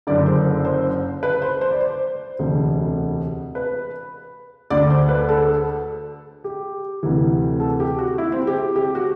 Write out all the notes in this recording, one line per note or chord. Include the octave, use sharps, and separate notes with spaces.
F#1 F#2 D3 D5
C5
C5
B4
C5
C5
D5
C5
E1 D2 C3
B4
D2 D3 D5
C5
B4
A4
G4
D2 C3 E3
A4
G4
F#4
E4
C4
G4
G4
F#4